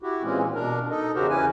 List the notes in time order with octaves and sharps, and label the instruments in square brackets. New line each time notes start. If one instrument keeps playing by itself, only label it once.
[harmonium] E4 F#4 G4
A#2 E3 G#3 C4 C#4
B2 D4 A#4
D#4 A4 D#5
E2 C#3 F#4 G4 A#4 C5
E3 C#4 E4 B4 G#5